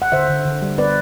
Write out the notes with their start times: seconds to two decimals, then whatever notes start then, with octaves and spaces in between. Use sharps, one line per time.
0.02 F#5
0.12 D3 C5 E5
0.30 D3
0.45 D3
0.62 G3
0.78 B3 B4 D5